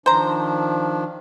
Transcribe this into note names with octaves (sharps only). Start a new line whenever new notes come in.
D#3 F3 D4 C5 A#5